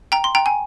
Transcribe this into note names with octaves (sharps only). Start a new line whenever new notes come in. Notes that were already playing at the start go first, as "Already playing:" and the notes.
G5 A#5
C6
G5 A#5
G#5